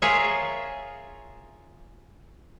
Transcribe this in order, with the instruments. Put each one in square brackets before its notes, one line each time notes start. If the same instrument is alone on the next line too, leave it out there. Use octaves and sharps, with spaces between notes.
[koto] F4 G#4 A#4 C#5 E5